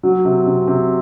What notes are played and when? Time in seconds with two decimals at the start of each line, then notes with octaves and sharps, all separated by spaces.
0.03 F#3
0.25 C3
0.46 C3
0.67 C3